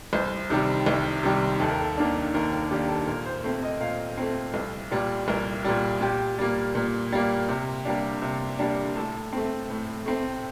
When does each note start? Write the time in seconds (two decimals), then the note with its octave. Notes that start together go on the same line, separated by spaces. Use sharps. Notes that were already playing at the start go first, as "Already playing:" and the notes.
0.13 C2 C5
0.50 C3 D#3 G3
0.86 C2
1.23 C3 D#3 G3
1.60 D#2 A4
1.70 A#4
1.80 A4
1.97 D#3 A#3 D4
2.34 D#2 A#4
2.52 A#4
2.71 D#3 A#3 D4 G4
2.88 A4
3.07 A#2 A#4
3.26 C5
3.44 A3 C4 C5
3.63 D#5
3.81 A#2 F5
4.18 A3 C4
4.54 C2
4.92 A#2 G3
5.28 C2 A#4
5.64 A#2 G3
6.01 A#2 G4
6.38 G3 A#3
6.75 A#2
7.12 G3 A#3
7.48 C3
7.85 G3 A#3 D4
8.22 C3
8.59 G3 A#3 D4
8.96 A2 A4
9.33 A3 C4
9.70 A2
10.06 A3 C4